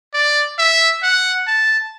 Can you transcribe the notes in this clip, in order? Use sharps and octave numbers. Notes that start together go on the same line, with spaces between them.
D5
E5
F#5
A5